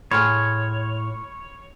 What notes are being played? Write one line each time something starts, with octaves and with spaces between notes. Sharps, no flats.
A2 G#4 C#5 B5 C6 F6